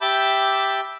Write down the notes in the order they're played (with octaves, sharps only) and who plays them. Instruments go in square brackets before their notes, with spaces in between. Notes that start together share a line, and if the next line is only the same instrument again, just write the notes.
[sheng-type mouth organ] G4 E5 A5 B5 D6 G6